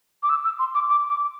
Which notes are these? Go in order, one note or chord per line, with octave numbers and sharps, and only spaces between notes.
D6
E6
E6
C6
D6
D6
D6